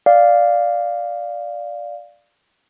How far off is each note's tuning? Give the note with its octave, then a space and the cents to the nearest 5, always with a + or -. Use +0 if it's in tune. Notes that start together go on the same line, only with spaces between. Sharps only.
D5 +0 F5 +0